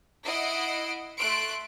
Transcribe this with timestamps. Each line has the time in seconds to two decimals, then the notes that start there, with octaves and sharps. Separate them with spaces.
0.25 E4 D#5 F#5 C7 D7
1.17 A3 C6 F#6 D7